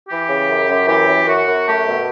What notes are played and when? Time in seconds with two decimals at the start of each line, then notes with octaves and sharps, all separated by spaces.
0.09 E3 G4
0.29 C#3
0.49 F#2
0.69 F#2
0.87 E3 G4
1.08 F#2
1.27 F#2 F#4
1.47 F#2
1.66 A3 G4
1.87 B2